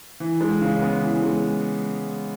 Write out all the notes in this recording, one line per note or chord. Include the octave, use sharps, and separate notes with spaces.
E3
G#3
C#3
B3
E3
G#3